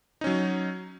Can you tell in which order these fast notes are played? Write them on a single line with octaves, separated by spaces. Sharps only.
D#4 C#4 F#3